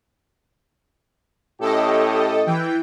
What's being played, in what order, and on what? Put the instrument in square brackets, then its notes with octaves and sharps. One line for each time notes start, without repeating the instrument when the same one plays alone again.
[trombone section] A2 C#4 G4 [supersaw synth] A4 D#5
[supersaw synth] E3 G5